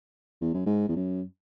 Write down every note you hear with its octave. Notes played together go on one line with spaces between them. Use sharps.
E2
F#2
G#2
E2
F#2